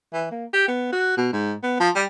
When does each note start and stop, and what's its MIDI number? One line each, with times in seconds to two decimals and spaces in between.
0.14 0.27 52
0.31 0.46 58
0.53 0.67 67
0.68 0.89 59
0.93 1.16 66
1.17 1.31 47
1.33 1.54 44
1.63 1.79 59
1.80 1.90 53
1.96 2.05 55